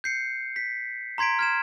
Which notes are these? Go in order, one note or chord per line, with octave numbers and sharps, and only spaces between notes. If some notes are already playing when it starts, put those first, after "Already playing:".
G6 C7 C#7
B6
A#5 C6 G#6 B6 D7
F6 G#6 E7